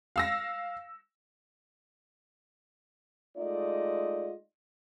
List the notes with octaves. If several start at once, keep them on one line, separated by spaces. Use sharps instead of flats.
F5 E6 A#6
G#3 A3 D#4 F4 D5 D#5